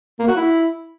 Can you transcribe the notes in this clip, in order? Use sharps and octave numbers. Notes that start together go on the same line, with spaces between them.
A#3
F#4
E4